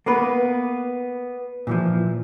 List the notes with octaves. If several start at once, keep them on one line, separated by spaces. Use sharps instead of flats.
A#3 B3 B4
A#2 E3 F3